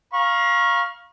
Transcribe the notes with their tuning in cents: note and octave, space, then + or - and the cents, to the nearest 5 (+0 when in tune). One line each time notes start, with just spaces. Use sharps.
F5 +0 A#5 +40 C#6 -15